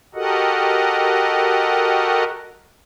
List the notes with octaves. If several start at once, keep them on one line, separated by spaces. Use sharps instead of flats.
F#4 G4 A4 A#4 D#5 F#5